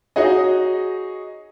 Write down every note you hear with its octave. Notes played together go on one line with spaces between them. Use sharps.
D#4 F#4 G#4 C#5 D#5